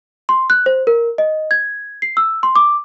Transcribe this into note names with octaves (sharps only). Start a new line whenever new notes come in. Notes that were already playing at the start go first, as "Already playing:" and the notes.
C6
F#6
C5
A#4
D#5
G#6
C7
E6
C6
D6